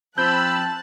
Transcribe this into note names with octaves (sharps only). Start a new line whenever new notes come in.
F3 C4 A5 B5 E6 F#6 G6